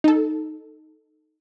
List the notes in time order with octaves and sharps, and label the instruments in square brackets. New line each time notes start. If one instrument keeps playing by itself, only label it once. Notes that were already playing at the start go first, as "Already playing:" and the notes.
[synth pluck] D#4 A4